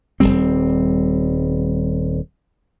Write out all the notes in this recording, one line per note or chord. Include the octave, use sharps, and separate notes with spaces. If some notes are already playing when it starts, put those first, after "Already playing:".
D#1 F2 G3 C4